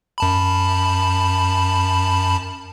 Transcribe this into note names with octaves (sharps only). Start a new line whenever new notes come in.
F#2 A5 B5